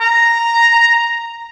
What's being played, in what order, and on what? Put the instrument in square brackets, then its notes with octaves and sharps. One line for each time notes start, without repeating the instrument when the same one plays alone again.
[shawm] A#5